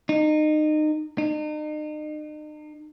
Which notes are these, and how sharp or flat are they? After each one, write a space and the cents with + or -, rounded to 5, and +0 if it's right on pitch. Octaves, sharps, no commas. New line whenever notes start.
D#4 -25
D#4 -40